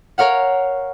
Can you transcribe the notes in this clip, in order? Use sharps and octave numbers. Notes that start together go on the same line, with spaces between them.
A#4 C#5 F5 F#5